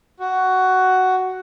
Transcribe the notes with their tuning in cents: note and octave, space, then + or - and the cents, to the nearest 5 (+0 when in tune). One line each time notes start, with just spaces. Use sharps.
F#4 +10